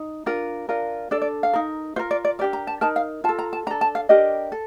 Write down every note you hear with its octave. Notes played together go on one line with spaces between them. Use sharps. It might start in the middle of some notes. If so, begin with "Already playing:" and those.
Already playing: D#4
D4 F4 A#4
D4 F4 A#4
D4 A4 D5
D5
F5
D#4 A#4
F4 A#4 C5
D5
D5
D4 G4 A#4 D5
A#5
A5
D#4 A#4 A5
F5
F4 A4 A5
A#5
A5
D4 A4 A#5
A5
F5
D4 G4 A#4 D#5
A4